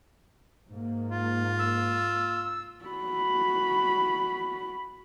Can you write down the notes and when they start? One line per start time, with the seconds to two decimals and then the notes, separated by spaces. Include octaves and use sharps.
0.69 G#2 A#3
1.11 F4
1.59 E6
2.85 F#4 B5